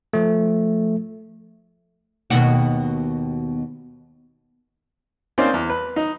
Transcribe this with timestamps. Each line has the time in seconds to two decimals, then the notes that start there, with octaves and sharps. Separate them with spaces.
0.13 F3 A3
2.30 D#2 B2 F#4
5.38 A#3 C4 C#4 D#4 C5 D5
5.54 E2
5.70 B4
5.96 D#4